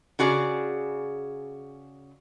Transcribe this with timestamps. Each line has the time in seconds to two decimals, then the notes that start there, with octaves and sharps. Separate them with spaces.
0.19 C#3 F#4 G#4 D5